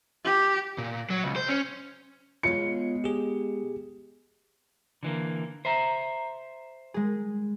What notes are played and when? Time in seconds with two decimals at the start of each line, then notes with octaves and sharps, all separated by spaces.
0.25 G4
0.78 A#2
1.10 F#3
1.24 C#2
1.36 C5
1.49 C#4
2.43 B2 G#3 F4 C#5 C#7
3.04 G4 G#4
5.03 D3 E3 A#3
5.65 C5 E5 A#5
6.94 G#3 G#4